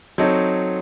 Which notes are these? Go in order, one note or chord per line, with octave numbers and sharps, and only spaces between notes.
F#3 C4 D#4 A4 C#5